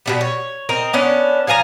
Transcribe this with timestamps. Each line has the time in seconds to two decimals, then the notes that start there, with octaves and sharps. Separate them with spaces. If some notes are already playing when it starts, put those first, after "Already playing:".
0.06 B2 D#3 G3
0.21 C#5
0.69 C4 A#4 D#5
0.93 B3 C#4 D4
1.47 F3 F5 G#5 A#5